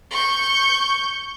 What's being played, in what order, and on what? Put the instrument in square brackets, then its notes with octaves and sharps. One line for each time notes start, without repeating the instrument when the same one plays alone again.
[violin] C#6 G6